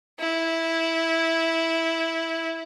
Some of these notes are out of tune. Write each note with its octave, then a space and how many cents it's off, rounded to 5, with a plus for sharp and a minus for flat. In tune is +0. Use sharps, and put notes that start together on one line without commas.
E4 -10